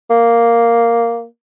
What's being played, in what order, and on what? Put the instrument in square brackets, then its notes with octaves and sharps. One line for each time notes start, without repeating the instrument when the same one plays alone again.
[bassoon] A#3